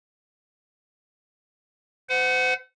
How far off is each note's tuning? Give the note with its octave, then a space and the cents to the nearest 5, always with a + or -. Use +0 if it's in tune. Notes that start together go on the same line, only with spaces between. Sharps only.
C5 -40 F#5 +0